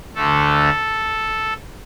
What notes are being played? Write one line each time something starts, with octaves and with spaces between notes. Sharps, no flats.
D2 D3 A3 A4